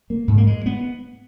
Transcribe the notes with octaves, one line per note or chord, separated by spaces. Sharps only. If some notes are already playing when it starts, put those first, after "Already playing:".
A#3
G#2
A#3
G#3
B3